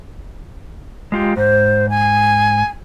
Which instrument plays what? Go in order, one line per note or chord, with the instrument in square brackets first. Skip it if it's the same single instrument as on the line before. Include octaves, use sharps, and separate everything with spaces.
[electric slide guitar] G#3 F4 G4
[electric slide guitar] G#2 [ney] C5
[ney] G#5